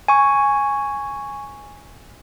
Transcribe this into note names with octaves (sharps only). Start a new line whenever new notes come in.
G#5 C#6